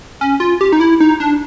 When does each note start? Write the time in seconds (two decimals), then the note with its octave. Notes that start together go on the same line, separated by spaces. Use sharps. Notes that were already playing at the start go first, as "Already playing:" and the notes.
0.21 C#4
0.40 F4
0.61 G4
0.72 D#4
0.80 E4
1.00 D#4
1.20 D4